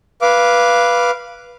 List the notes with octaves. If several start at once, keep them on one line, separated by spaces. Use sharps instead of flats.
B4 F5 D6